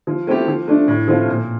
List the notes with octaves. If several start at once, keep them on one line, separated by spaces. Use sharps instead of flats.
F3
A3 C4 E4 G4
F3
A3 D4
A2
F3 A3 C4 F4
A#2